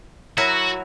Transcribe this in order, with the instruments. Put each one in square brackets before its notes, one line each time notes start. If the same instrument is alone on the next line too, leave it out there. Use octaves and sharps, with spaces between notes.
[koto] F#3 E4 A#4 [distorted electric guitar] F#4